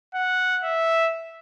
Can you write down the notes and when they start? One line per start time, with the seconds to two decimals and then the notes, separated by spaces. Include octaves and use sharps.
0.15 F#5
0.64 E5